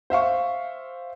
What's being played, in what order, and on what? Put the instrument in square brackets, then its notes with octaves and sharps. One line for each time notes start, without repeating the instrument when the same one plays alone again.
[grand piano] C5 E5 F5 C#6